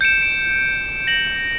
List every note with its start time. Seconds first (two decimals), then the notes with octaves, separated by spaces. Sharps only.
0.01 G6 C#7 D7 E7
0.22 D7
1.07 A#6 F#7